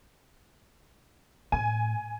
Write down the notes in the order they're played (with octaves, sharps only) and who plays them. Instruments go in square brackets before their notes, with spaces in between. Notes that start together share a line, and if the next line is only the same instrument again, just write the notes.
[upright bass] A2 [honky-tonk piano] G#5